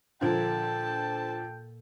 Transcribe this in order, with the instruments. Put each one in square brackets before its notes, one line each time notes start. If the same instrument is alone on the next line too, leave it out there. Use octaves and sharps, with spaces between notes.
[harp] A#2 G#6 D7 [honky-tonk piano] D3 F3 [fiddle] A4 A5 [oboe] G5